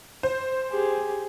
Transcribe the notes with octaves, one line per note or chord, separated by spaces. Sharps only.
C5
G4 G#4